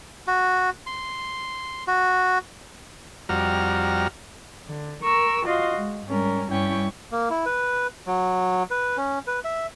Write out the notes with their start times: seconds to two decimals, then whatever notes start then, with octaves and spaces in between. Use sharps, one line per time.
0.27 F#4
0.87 C6
1.87 F#4
3.29 F2 G3 F#4 A#5 F6
4.66 D3
5.03 A#4 C#6 E6
5.44 F4 F#4 D#5 F5 C6
5.75 G#3
6.07 G#2 G3 C#4 A#4
6.49 G2 G3 C#4 E4 G5 C#6
7.12 A#3
7.30 E4
7.46 B4
8.07 F#3
8.71 B4
8.97 C#4
9.27 B4
9.45 E5